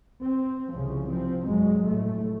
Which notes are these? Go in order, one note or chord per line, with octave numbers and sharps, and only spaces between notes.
C4
C2 C#3 F3
F3 C4
G1 G#2 F#3 G#3
F1 A2 A3